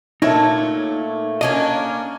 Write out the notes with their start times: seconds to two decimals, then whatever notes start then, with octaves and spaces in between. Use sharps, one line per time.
0.22 A#2 A3 D#4 C#5 E5
1.41 A#3 C#4 D4 D#5